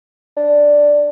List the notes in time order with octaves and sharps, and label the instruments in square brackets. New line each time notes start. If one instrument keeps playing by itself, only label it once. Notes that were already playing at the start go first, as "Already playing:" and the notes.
[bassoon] D4